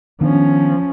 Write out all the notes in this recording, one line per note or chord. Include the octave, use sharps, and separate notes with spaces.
D#3 F3 B3 C#4 D4